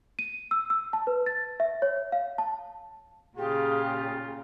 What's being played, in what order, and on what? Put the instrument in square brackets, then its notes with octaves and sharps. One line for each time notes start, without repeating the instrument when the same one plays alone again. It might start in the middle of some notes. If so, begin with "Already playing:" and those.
[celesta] D#7
E6
E6
A5
B4
A6
E5
C#5
F5
A5
[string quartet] A#2 C#3 [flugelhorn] F4 [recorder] G4 [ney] G#4